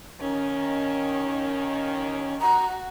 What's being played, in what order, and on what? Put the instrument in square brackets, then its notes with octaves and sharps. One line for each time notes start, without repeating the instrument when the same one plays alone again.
[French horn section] D#2 D#3 [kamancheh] C#4
[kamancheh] F#4 [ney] A#5